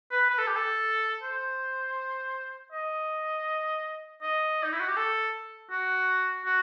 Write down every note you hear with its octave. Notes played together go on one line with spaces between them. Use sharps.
B4
B4
A4
G4
A4
C5
D#5
D#5
D#4
E4
F#4
G4
A4
F#4
F#4